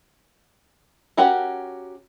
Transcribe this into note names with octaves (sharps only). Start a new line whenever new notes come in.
C#4 F#4 G4 A#4